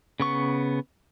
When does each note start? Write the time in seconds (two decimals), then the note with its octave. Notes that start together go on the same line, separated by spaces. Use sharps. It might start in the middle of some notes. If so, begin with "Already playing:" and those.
0.20 C#3 B3 C#6